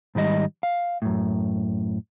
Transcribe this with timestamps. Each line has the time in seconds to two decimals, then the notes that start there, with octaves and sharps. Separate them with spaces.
0.15 G#2 D#3 G3 D#5
0.63 F5
1.02 F#2 A2